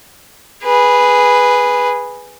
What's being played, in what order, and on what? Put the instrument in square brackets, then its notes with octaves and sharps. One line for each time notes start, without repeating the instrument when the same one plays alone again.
[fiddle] G#4 B4